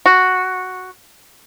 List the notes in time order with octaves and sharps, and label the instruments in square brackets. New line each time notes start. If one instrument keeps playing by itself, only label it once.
[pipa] F#4